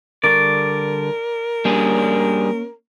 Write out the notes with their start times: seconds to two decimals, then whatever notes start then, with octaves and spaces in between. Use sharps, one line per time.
0.24 D3 G3 A#4 D5 C#6
1.65 G3 A#3 C#4 D4 G#4